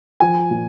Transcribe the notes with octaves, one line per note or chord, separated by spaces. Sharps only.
F3 G#5
A#2